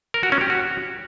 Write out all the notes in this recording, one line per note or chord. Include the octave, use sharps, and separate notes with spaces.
A#4
F#4
C#4
G4
F#4